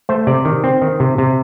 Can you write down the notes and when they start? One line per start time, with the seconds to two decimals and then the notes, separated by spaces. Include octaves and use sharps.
0.09 A3 C5
0.27 C3 D5
0.45 D#3
0.64 C4
0.82 D#3
1.00 C3
1.18 C3